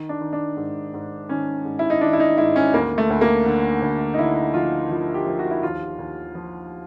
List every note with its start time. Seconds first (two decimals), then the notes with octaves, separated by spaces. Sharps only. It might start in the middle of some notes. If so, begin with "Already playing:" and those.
Already playing: D#3
0.09 D4
0.21 D#3
0.33 D4
0.57 G#2
0.94 G#2
1.29 D#3 C#4
1.65 G#2
1.79 E4
1.90 D#4
2.01 D#3 D4
2.13 E4
2.20 D#4
2.37 G#2 E4
2.56 C#4
2.73 D2 A#3
2.98 A3
3.10 D2
3.21 A#3
3.46 D3
3.82 D2
4.14 D#4
4.19 D3 E4
4.54 F3 F4
4.90 F3 F4
5.14 G4
5.27 F3
5.39 F#4
5.51 E4
5.63 D#2 F4
5.99 D#2
6.35 F3